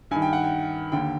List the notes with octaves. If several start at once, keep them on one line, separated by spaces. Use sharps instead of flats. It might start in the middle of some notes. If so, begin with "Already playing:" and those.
G2 D#3 G#5
G5
F#5
G5
D#2 D3 G5